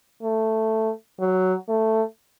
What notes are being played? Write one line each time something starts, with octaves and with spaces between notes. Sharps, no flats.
A3
F#3
A3